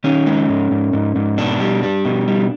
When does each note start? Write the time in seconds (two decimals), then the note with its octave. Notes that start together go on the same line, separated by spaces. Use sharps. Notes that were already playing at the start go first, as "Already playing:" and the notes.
0.04 D#3 C#4
0.26 G#3
0.49 G#2
0.71 G#2
0.93 G#2
1.16 G#2
1.38 B2 D4
1.60 G3
1.83 G3
2.05 B2
2.27 G3